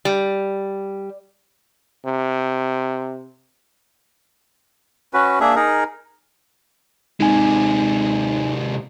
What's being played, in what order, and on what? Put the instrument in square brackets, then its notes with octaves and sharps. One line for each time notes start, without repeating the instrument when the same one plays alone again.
[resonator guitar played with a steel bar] G3
[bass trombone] C3
[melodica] C#4 F#4 B4
A#3 D4 G#4 E5
D#4 G#4 A#4
[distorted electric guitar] C3 G#3 [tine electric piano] D#4 G#5